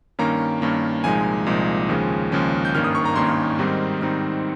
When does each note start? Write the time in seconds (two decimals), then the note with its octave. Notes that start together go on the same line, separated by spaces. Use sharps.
0.19 G2 D#3 A#3 C#4 A#5
0.62 G2 D#3 A#3 C#4
1.04 C2 A#2 F3 G#3 D#4 G#5
1.46 C2 A#2 F3 G#3 D#4
1.89 D#2 C#3 F3 G#3 C#4
2.32 D#2 C#3 F3 G#3 C#4
2.65 G6
2.74 G#1 G2 D#3 A#3 C#4 F6
2.84 D#6
2.95 C#6
3.05 A#5
3.16 G#1 G2 D#3 A#3 C#4 C6
3.59 G#2 D#3 G3 C4 D#4
4.01 G#2 D#3 G3 C4 D#4